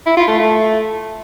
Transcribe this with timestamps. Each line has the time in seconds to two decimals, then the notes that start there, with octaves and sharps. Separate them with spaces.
0.06 E4
0.17 F4
0.28 A3
0.38 A3